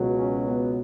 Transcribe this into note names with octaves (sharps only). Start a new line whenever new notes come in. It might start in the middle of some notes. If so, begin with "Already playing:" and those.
Already playing: C#2 B2 F#3
C#4
B3